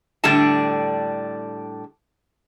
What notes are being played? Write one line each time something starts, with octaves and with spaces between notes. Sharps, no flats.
A2 D3 G3 D4 A4 A5